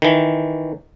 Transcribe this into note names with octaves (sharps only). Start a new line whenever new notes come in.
D#3 E3